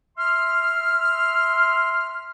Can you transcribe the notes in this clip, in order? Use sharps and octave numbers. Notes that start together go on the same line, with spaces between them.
E5 C6 F6